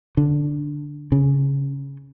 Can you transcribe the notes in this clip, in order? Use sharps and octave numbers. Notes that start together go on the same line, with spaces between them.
D3
C#3